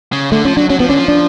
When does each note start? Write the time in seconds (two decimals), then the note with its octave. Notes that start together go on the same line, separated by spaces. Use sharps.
0.13 C#3
0.31 D3 A3
0.45 F3 C#4
0.57 F#3 D4
0.70 F#3 C#4
0.79 F3 B3
0.88 D3 C#4
0.98 F3
1.08 D4